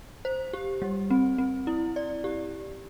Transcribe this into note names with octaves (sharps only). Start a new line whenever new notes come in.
C5
G4
G3
C4
C4
E4
D5
G4